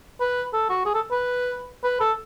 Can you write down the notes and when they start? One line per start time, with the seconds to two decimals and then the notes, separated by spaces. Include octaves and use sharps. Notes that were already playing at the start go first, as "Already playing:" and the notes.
0.20 B4
0.53 A4
0.70 F#4
0.86 G#4
0.94 A4
1.11 B4
1.84 B4
2.01 A4